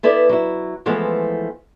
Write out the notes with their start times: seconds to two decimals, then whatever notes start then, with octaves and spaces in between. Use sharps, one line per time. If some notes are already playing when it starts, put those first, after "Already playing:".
0.03 B3 E4 A4 B4 D5
0.29 F#3 E4
0.86 E3 F3 G#3 A3 B3